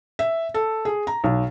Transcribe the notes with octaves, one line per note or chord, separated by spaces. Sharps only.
E5
A4
G#4
A#5
B1